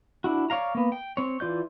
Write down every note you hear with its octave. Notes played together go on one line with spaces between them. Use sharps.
D4 E4 F#4
C#5 D5 F5 A#5
A#3 B3
G5
C4 C#5
E3 F4 D5 G6